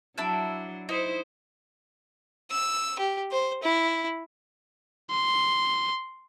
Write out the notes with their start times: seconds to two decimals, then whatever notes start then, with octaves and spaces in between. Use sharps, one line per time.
0.18 F#3 D4 E4 E6
0.89 D#4 E4 C5
2.51 E6
2.99 G4
3.32 C5
3.63 E4
5.11 C6